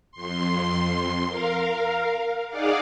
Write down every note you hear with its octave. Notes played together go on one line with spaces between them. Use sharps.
F2 C6
A#4 F5
D#4 G#4 D5 F5 F#5 D6